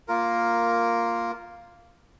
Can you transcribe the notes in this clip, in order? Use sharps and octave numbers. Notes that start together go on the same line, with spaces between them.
A#3 F4 A#4